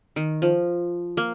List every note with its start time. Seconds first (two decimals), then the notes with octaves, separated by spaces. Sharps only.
0.16 D#3
0.42 F3
1.17 A#3